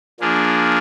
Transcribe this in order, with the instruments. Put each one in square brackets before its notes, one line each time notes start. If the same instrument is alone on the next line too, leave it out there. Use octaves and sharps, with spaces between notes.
[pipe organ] F3 A#3 D4 G#4